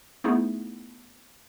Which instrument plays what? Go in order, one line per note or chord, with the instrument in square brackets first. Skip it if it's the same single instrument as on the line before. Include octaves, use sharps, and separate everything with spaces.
[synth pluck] A3 B3 D#4 E4 G#4